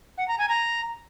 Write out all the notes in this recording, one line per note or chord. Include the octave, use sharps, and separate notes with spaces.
F#5
A#5
G#5
A#5